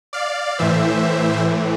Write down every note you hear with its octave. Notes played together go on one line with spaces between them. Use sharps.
D5 F5
A2 E3 C5 E5